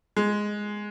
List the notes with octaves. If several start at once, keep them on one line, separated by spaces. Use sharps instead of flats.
G#3